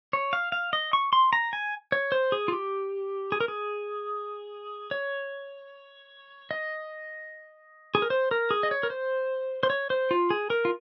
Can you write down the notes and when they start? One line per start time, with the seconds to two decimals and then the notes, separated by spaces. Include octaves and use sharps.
0.13 C#5
0.33 F5
0.52 F5
0.73 D#5
0.93 C#6
1.13 C6
1.33 A#5
1.53 G#5
1.92 C#5
2.12 C5
2.32 G#4
2.48 F4
2.52 G4
3.32 G#4
3.40 A#4
3.48 G#4
4.91 C#5
6.51 D#5
7.95 G#4
8.02 A#4
8.10 C5
8.31 A#4
8.51 G#4
8.63 D#5
8.71 C#5
8.83 A#4
8.90 C5
9.63 C5
9.70 C#5
9.90 C5
10.11 F4
10.30 G#4
10.50 A#4
10.65 F4